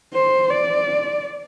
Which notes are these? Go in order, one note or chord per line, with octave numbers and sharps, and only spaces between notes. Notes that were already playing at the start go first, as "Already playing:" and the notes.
C5
D5